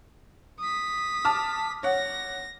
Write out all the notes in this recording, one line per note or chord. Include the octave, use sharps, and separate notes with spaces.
D#6 B6
A5 D6 F6
C#5 F#5 A#6